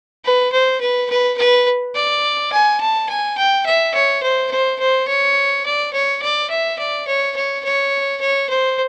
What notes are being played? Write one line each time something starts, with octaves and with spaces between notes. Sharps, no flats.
B4
C5
B4
B4
B4
D5
G#5
A5
G#5
G5
E5
C#5
C5
C5
C5
C#5
D5
C#5
D5
E5
D5
C#5
C#5
C#5
C#5
C5